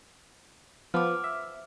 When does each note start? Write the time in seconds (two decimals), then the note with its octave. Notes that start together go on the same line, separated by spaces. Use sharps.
0.94 F3 B3 D6 F6
1.24 E5